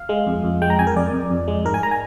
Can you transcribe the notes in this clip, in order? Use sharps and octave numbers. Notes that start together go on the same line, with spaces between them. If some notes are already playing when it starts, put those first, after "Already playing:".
Already playing: F5
G#3
F2
F2
G#3 G5
A#5
F2 G#5
A#4
F2 D5
F2
F2
G#3
G#2 A#4
G#5
A#5
G#5